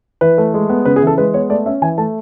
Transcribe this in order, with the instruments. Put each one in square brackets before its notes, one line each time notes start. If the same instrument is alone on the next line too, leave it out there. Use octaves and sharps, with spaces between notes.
[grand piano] E3 B4
A3
G#3
B3
C#3 B4
G#4
E3 A4
G#3 B4
B3 C#5
A3 D5
C#4 E5
E3 G#5
A3 A5